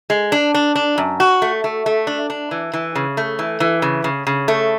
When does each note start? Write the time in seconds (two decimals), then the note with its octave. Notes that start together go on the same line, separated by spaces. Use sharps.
0.10 G#3
0.32 D4
0.54 D4
0.75 D4
0.98 F#2
1.20 F#4
1.42 A3
1.64 A3
1.86 A3
2.07 D4
2.30 D4
2.51 E3
2.73 E3
2.95 C#3
3.17 A3
3.39 E3
3.60 E3
3.82 C#3
4.04 C#3
4.27 C#3
4.48 A3